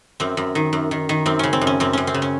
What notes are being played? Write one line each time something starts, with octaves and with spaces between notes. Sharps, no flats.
F#2 C4
F#2
D#3
F#2
D#3
D#3
F#2 C4
C#3 C#4
C4
F#2
C#4
F#2 C4
F#2 C#4
C4
C#3
C#4